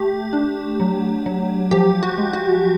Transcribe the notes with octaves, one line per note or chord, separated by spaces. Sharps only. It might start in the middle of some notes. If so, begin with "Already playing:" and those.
Already playing: A3 G4
D4
F#3
F#3
F3 G4
F#4
G#3
F#4